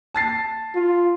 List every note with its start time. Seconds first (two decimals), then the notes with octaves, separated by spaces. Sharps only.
0.15 A5 A6 C7
0.75 F4